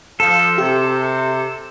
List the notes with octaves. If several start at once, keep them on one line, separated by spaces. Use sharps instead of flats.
F3 A4
C3 G4